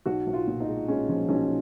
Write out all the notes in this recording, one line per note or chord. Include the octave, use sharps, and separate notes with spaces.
B1 F#4
B1
F4
A#2
D#4
G#3
G#3 C#4
F3 C#4
B1 C#4